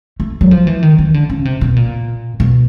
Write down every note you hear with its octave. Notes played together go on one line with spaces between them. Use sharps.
A3
F#3
F3
E3
D#3
D#3
D3
C#3
C3
B2
A#2
B2